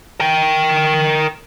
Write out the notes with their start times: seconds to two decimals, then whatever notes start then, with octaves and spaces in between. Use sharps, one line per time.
0.20 A#4 G5